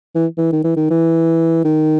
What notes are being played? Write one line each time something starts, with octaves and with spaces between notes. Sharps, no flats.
E3
E3
D#3
E3
D#3
E3
D#3